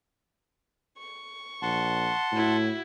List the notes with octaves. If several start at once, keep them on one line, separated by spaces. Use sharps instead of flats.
C#6
A#1 F#5 A5 C6
A2 E4 F#4